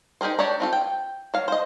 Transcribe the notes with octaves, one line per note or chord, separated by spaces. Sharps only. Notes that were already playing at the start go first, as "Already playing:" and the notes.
D#4 G4 G#4 A#4 C5
D4 G4 C#5 D5 A#5
C4 F4 A4
G5
F#3 F5
C5 D#5